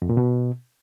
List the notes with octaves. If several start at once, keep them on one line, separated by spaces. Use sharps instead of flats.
F2
A#2
B2